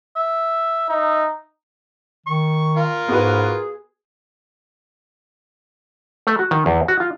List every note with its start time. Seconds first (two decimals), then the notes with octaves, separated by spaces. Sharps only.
0.16 E5
0.89 D#4 E5
2.27 D#3 C#6
2.77 F4 A#4
3.08 G#2 B3 F#4 G#4 B4
6.27 A3
6.39 F#4
6.51 D#3
6.66 E2
6.88 F#4
7.00 F4